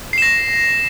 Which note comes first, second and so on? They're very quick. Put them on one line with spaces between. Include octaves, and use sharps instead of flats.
C7 E7 A#6